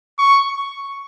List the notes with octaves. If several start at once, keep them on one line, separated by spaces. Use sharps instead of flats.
C#6